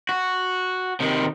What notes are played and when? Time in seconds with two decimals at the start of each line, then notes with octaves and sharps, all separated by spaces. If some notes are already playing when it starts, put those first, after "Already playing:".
0.09 F#4
1.00 C3 D#3